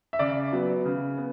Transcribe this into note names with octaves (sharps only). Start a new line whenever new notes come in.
E5
C#3 D5
F#3 B3
C#3
B3